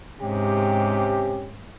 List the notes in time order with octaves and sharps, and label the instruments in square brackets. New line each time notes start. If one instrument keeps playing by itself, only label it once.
[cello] G#2 [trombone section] C3 C#4 G4